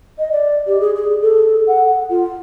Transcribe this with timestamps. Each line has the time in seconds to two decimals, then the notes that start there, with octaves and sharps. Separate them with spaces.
0.19 D#5
0.32 D5
0.67 G4
0.80 G#4
0.95 G#4
1.21 A4
1.67 F#5
2.09 F4